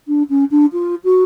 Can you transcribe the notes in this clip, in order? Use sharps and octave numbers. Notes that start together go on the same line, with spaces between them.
D4
C#4
D4
F4
F#4